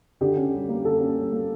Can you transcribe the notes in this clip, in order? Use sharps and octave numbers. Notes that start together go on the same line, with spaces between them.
D3 G4
C#4
G3
A#3
D3 A4
C#4
G3
A#3